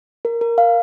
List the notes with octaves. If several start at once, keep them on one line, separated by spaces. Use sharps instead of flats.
A#4
A#4
F5